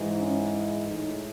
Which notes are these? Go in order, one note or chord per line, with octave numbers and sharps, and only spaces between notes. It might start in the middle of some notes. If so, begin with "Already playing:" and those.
Already playing: G#2 E3 G#3
C#4
A2 G#3 D#4